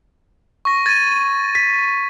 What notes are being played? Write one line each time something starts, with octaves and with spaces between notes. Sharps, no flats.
C#6 A#6
G#6 A6 D#7
B6